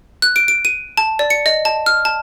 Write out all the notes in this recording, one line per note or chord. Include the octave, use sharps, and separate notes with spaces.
F#6
D7
D7
D#7
A5
D5
C#7
D#5
A5
F6
A5